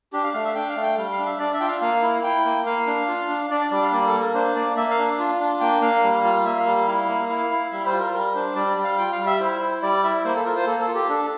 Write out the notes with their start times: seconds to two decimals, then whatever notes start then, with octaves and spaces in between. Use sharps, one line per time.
0.13 D4 G4
0.24 F5
0.34 A3 F5
0.44 E5
0.55 D4 G5
0.69 F5
0.76 A3
0.83 G5
0.98 G3 F5
1.11 F5
1.19 D4
1.26 E5
1.39 D4 D5
1.54 E5
1.61 F4 G5
1.67 F5
1.81 A#3 F5
2.02 E4
2.24 E4 G5
2.45 A#3
2.66 A#3 F5
2.87 D4
3.08 F4
3.29 D4
3.50 D4 D5
3.61 D5
3.71 G3 D5
3.82 F5
3.92 A#3 D5
4.07 A4
4.14 A#3
4.20 A#4
4.34 D4 C5
4.56 A#3 D5
4.76 A#3 E5
4.91 F5
4.98 D4
5.19 F4
5.40 D4
5.60 A#3 G5
5.82 A#3 F5
6.03 G3
6.24 F4
6.45 A#3 E5
6.59 F5
6.66 G3
6.87 E4 F5
7.08 A#3
7.29 E4 F5
7.50 E4
7.72 G3 E5
7.86 C5
7.93 F4
8.00 A#4
8.14 G3 A#4
8.35 D4 C5
8.56 G3 D5
8.77 G3
8.84 F5
8.98 F4 G5
9.12 F5
9.20 G3
9.26 E5
9.40 E4 C5
9.62 E4
9.82 G3 D5
10.04 E4 E5
10.25 A#3 C5
10.35 A4
10.45 F4 A#4
10.56 C5
10.67 A#3 A4
10.80 A4
10.88 F4
10.95 G4
11.09 D4 A4